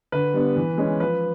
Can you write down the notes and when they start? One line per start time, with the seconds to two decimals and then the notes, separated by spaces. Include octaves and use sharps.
0.12 D3 B4
0.34 G3 B3 D4
0.56 E3
0.78 G#3 C#4
1.00 F3 B4